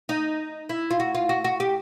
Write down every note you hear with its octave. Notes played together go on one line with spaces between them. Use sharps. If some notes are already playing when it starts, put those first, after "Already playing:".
D#4
E4
F4
F#4
F4
F#4
F#4
G4